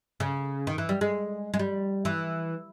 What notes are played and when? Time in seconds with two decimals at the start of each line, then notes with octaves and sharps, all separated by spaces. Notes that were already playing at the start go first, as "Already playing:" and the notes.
0.20 C#3
0.67 D#3
0.78 E3
0.89 G3
1.01 G#3
1.54 G#3
1.59 G3
2.05 E3